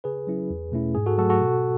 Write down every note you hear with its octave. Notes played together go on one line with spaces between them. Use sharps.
C#3 G#4 B4
F#3 C#4 E4
E2
B2 A3 C#4 E4
G#2 G#4
F#4 A4
F#3 A3 F#4 A4
F#4 A4
B2